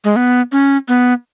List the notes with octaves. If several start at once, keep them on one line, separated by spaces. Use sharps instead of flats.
G#3
B3
C#4
B3